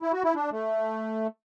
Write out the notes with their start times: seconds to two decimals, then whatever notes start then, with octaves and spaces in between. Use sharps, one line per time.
0.02 E4
0.13 F#4
0.24 E4
0.35 D4
0.52 A3